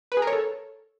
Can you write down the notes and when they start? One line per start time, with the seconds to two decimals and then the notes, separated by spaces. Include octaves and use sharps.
0.12 B4
0.17 G#4
0.22 A#4
0.27 C#5
0.33 A4